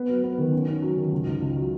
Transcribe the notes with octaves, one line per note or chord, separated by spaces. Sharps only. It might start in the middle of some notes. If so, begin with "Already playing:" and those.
Already playing: B3
F#3
B3
D#3
C#4
C#4
F#3
D#3
C#2
C#2
C#2
F#3